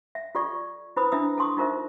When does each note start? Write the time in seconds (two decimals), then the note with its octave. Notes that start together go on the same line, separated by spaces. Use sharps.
0.15 E5
0.35 F4 G4 A4 D5 C#6
0.97 E4 B4 C5 B5 D#6
1.12 D4 E4 E5 A#5 D#6 E6
1.38 A4 A5 C6 C#6 D#6
1.57 D#4 F4 A#4 C5 E5